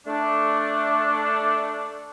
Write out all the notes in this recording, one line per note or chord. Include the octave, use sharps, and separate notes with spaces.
A3 D4